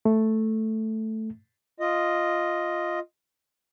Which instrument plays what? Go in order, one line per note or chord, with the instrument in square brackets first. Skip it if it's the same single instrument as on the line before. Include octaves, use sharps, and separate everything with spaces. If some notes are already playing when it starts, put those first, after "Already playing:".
[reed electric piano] A3
[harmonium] F4 D#5